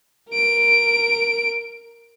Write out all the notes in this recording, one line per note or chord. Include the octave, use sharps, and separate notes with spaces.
A#4 D7